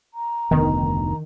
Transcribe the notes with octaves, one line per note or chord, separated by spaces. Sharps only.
A#5
F1 D2 D#3 B3